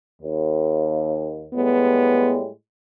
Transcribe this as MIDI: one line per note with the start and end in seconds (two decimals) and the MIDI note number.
0.21 1.48 39
1.53 2.48 45
1.53 2.48 55
1.53 2.48 56
1.53 2.40 59